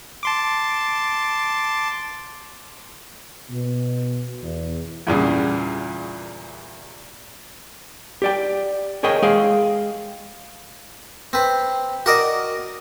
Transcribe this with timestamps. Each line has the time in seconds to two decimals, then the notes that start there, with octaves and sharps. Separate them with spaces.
0.23 A5 C6 D6
3.49 B2
4.42 E2
5.07 E2 G2 A#2 C#3
8.22 G4 D5 G5
9.03 G#4 A#4 C#5 D#5 G5
9.22 G#3 G#4 F5 G5
11.33 C4 B4
12.06 F#4 A#4 D5 D#5